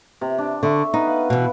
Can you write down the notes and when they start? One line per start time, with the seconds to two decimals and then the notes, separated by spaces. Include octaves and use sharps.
0.21 C3
0.38 D4
0.63 D3 E5 C#6
0.94 B3 D#4 B4
1.07 F5
1.30 B2 E3